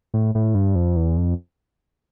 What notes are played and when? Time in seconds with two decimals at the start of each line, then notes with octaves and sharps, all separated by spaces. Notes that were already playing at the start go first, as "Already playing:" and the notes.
0.14 A2
0.35 A2
0.55 G2
0.75 F2
0.96 E2
1.17 F2